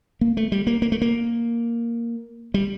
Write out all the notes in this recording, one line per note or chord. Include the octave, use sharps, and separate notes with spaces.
A#3
A3
G3
A#3
A#3
A3
A#3
G3